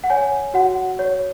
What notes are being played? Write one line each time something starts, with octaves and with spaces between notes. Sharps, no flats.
F#5
C#5 G#5
F#4 F#5
C#5